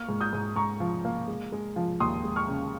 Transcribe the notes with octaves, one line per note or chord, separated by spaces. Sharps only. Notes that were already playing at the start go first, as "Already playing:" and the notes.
Already playing: A#3 C#6 F6
G#2
D#6 G6
G#2
G#2 A#5 C#6
F3
A#3
G#3
G#3
F3
D#2 C6 D#6
G#3
C#6 F6
C#3